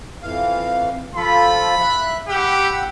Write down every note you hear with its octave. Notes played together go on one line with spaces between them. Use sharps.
F2 E3 F5
F3 F4 A4 B5
E5 F#6
G4 F#5 B5 E6